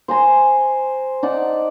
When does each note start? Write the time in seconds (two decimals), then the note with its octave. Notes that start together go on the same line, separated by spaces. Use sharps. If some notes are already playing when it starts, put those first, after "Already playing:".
0.08 C5 G#5 A#5 C6
1.23 D#4 D5 F#5 A5